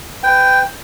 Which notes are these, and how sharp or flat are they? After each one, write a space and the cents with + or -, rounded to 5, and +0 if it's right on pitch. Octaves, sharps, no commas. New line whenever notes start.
B4 +30 G5 +0